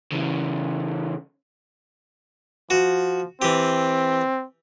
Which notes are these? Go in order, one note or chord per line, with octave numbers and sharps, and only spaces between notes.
C#3 E3
F3 F#4
E3 C4 G4